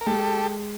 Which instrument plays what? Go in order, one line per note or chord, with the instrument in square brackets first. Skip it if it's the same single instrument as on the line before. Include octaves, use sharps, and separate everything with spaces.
[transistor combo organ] A#4
[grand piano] G#3 [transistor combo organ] G4 A4